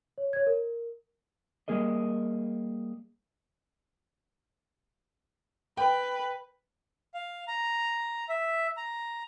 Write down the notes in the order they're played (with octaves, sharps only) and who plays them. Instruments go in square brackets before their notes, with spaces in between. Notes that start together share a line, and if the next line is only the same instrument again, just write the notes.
[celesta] C#5
C#5 G#6
A#4
[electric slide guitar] G3 A#3 G#4 A#4 D#5
[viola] B4 [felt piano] G5
[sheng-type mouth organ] F5
A#5
E5
A#5